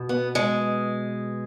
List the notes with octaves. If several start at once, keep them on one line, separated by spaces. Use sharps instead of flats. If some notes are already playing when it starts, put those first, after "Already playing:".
Already playing: B2
B3
G#3